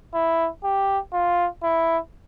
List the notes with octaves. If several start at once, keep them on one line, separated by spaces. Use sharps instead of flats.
E4
G4
F4
E4